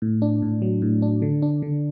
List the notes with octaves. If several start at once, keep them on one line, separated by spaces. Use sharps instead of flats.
A2
D4
A2
F#3
A2
D4
D3
D4
D3